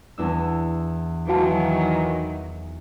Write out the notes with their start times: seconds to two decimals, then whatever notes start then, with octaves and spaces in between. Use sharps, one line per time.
0.18 E2 D4 E6
1.29 D#3 E3 F#3 F#4 F5 A5